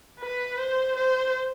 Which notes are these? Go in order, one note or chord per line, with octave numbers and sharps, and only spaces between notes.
B4
C5
C5